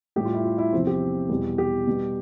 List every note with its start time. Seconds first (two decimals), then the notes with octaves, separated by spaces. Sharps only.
0.16 A2 G3 G4
0.25 F4
0.34 E4
0.44 F4
0.58 E4
0.73 E2 C3 F3 C4
0.87 G4
1.29 E2 B2 G3
1.58 G4
1.87 B2 G3